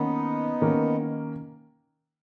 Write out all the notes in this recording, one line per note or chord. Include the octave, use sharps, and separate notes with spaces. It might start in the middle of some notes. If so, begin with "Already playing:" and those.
Already playing: D#3 A#3 B3 C#4 D#4
D#3 A#3 C#4